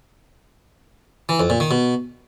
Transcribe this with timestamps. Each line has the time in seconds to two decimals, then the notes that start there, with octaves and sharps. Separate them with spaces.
1.29 E3
1.39 F2
1.50 A#2
1.60 D#3
1.71 B2